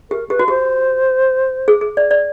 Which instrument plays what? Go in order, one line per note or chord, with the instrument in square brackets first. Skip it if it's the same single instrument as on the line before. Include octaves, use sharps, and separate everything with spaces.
[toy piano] G4 [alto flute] A#4
[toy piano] G4 [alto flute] B4
[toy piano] F#4
[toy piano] G4 [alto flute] C5
[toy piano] G#4
G#4
D5
D5